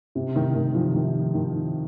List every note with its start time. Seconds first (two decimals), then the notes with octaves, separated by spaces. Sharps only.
0.15 C3
0.36 D#3
0.55 D#3
0.75 F3
0.95 D#3
1.34 D#3